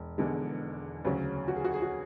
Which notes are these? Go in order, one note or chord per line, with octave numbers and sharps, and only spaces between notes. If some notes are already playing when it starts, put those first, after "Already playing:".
Already playing: E1
E1 E2 D3 G#3
D2 C#3 F#3 C#4
F#4
G#4
F#4
G#4
F#4